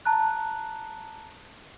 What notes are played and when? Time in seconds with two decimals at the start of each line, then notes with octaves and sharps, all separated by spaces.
0.05 A5 A#5 F#6